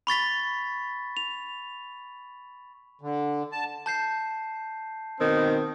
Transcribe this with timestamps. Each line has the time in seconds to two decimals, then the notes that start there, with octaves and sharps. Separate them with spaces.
0.07 B5 C#6 A6 B6
1.17 F7
3.01 D3
3.52 A5
3.86 A5 G6 C7
5.20 B2 D#3 C4